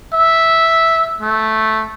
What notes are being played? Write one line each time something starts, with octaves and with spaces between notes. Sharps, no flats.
E5
A3